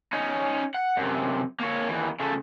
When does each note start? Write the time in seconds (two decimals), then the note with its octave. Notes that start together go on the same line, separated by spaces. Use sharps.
0.13 C#4 D#4
0.74 F#5
0.97 F#2 C3
1.60 A#3 C#5
1.89 D#2 E3
2.20 C#3 A3